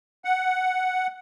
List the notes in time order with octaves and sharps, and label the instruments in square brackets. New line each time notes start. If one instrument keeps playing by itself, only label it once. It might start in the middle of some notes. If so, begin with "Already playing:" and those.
[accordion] F#5